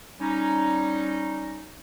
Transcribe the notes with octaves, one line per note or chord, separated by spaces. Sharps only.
G3 C#4 D#4